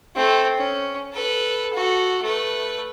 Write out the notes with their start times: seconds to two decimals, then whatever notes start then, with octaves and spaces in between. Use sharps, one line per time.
0.16 A3 C4
0.58 C#4
1.13 A4 B4
1.74 F#4 A4
2.23 A3 B4